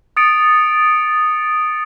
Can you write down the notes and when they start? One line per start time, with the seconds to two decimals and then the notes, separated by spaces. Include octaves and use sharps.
0.17 D#6 A6 C#7 D7